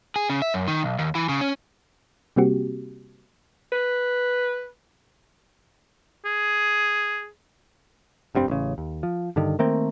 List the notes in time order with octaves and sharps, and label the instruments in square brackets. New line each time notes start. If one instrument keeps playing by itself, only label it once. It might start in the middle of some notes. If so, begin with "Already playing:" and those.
[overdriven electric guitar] G#4
C#3
E5
F#2
D#3
B1
D#2
E3
C#3
C#4
[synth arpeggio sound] C3 G3 A#3 C4 F#4 G4
[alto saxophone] B4
[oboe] G#4
[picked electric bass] F1 G2 G3 C4
A1 C#3
D#2
F3
G2 D3 D#3
D#3 A3 A#3 C4